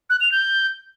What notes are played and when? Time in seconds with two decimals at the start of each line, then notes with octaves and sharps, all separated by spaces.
0.10 F#6
0.21 F7
0.32 G6